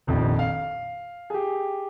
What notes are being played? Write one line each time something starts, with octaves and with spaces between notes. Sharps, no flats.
D#1 A#1 F2
F5
G4 G#4